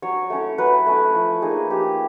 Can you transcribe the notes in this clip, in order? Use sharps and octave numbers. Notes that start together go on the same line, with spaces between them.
F#3 C#5
A3 C#4 E4
F#3 B4
A3 C#4 E4
F3
A#3 D#4 G#4
F3 G4